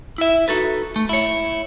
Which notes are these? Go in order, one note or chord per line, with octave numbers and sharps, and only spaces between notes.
E4 E5
D#4 F#4 A4 B4
A3
E4 C#5